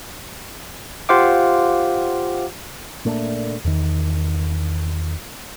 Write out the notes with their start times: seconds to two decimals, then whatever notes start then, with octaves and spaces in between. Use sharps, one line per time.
1.09 F4 G4 C5 F5 F#5 D6
3.05 A#2 A3 A#3 D4
3.65 E2 D#3